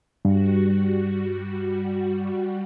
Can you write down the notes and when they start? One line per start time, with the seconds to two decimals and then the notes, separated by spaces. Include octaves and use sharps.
0.25 G2 G3 F#4